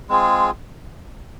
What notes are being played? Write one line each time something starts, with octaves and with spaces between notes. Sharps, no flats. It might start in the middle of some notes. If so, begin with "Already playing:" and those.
G#3 C4 F4 G#4